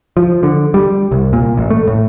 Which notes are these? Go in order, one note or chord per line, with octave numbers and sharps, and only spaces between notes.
F3
D3
G3
C2
A#2
A1
A3
A2